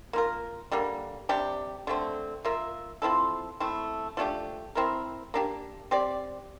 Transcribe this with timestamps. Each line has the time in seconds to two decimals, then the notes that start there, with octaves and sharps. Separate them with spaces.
0.13 A#3 F4 A#4
0.71 D3 G3 A#3
1.29 C3 G3 D4 G4
1.87 D3 A3 C4
2.45 A#3 F4 A#4 E5
3.02 F3 C4 E4 A4
3.60 A3 C4 E4
4.17 F3 A3 D4 G4
4.75 C4 E4 A#4
5.34 A#3 D4 G4
5.91 C4 G4 D5